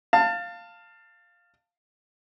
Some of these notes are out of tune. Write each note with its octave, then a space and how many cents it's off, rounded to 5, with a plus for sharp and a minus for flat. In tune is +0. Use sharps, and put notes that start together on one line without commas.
F5 +0 A5 +25